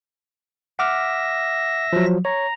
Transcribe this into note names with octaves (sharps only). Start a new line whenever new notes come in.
E5 F#5 D6 F6 A#6
F3 F#3
C#5 A#5